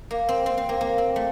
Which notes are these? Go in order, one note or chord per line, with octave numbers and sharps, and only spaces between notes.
A#3
C4
C4
C4
A#3
A#3
C4
A3